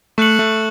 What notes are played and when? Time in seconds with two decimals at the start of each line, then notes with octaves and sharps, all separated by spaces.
0.18 A3 C#6 F#6 C#7 F#7
0.39 A3